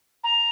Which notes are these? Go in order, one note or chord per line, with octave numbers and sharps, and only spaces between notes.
A#5